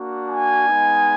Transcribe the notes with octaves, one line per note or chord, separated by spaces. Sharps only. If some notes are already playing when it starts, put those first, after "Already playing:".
Already playing: A#3 D4 F#4
G#5
G#3 B3 D#4